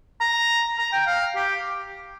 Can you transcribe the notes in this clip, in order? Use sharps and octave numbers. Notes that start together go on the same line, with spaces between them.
A#5
A#5
G5
F5
G4